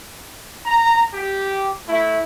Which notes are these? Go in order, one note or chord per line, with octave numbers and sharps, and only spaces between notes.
A#5
G4
A3 E4